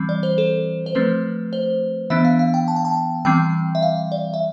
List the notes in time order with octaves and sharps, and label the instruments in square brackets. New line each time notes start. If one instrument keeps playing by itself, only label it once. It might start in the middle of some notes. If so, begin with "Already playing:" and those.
Already playing: [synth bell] E3 G3 C4
D5
C5
A4
C5
F3 A3 C4 B4
C5
E3 B3 D4 E5
F5
F5
G5
A5
G5
A5
E3 G3 C4 G5
E5
F5
D5
E5